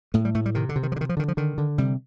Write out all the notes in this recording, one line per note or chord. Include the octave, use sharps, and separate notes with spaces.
A2 A3
G3
A2 A3
G3
C3 D#3
D3
C3
D#3
F3
D3
D#3
F3
D3 D#3
F3
D3 D#3
D3
C3 G3